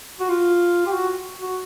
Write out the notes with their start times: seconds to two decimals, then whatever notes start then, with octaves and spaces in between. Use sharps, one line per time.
0.20 F#4
0.29 F4
0.86 G4
0.93 F#4
1.42 F#4